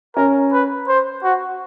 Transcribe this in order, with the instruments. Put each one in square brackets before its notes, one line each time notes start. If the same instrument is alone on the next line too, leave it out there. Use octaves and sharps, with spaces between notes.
[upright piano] C#4 [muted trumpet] A#4
[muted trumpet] B4
C5
F#4